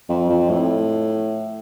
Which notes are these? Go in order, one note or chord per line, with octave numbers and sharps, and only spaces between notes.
F2
F2
A2